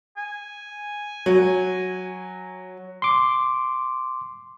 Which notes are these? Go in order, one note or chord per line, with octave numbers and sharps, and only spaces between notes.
G#5
F#3
C6 D6